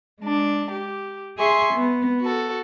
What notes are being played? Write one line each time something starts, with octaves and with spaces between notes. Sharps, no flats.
G#3 D4
G4
G#4 E5 G#5 C6 C#6
B3
F#4 A4